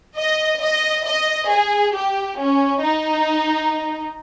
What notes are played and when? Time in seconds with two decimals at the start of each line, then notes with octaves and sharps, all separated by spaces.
0.16 D#5
0.60 D#5
1.04 D#5
1.49 G#4
1.93 G4
2.37 C#4
2.81 D#4